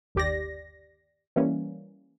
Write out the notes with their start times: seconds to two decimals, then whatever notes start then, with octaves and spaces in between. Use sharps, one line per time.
0.15 G1 D#2 G4 D5 A#6
1.36 E3 G3 A#3 C#4